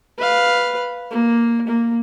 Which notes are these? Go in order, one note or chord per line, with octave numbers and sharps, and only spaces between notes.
B4 F5
A#3
A#3